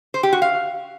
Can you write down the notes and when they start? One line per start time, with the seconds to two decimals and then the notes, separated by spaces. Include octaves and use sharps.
0.14 C5
0.23 G4
0.32 F#4
0.42 F5